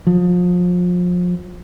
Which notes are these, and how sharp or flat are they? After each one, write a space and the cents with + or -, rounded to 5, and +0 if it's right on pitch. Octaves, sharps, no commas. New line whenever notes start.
F3 +30